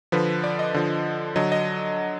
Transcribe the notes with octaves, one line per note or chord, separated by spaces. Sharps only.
D3 F3 B4
D5
D#5
D3 F3
D3 F#3 D#5
D#5